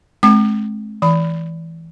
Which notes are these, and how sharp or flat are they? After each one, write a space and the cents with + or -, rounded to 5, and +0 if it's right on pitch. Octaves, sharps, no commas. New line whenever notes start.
G#3 +45 C4 +40 D6 +45
E3 -5 B5 +15